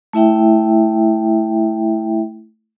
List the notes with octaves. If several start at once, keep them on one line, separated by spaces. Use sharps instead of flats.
A3 E4 E5 G5